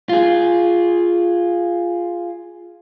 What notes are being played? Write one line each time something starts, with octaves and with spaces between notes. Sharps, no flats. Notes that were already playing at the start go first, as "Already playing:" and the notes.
F4 G#4